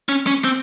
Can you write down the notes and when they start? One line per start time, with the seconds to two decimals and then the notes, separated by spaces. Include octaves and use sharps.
0.09 C#4
0.27 C#4
0.44 C4